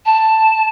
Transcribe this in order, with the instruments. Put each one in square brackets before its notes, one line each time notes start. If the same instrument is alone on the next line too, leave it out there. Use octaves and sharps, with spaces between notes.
[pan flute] A5